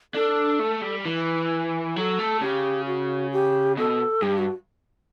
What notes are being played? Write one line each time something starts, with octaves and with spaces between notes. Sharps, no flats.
D4 A4
A3
G3
E3 B4
F#3 A4
A3
C#3 G4
F#4
G4
B2 A4
G2 G4
F#4